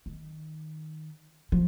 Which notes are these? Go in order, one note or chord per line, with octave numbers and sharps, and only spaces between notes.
D#3
F3